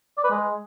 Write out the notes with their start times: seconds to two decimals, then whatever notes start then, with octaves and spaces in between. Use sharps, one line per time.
0.17 D5
0.24 B4
0.31 G#3